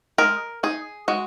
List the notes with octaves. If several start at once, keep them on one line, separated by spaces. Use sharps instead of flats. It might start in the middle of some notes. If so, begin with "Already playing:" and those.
G#3 A#4
D#4 G#4
G#3 F#4